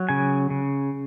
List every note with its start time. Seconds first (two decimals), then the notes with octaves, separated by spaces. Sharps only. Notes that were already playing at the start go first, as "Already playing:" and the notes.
Already playing: F#3
0.09 C#3 G#5
0.50 C#3